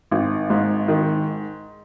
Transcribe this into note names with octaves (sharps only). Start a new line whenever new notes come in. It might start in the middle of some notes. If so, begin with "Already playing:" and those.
G#1
G#2
D#3